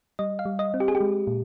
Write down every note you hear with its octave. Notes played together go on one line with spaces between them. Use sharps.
G3 D#5
F5
G3
D#5
C4
G4
G#4
G4
G#3
A#2